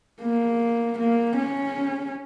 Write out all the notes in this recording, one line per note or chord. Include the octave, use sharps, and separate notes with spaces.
A#3
A#3
C#4